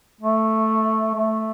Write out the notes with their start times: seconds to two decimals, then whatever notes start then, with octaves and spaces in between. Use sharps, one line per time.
0.21 A3
1.15 A3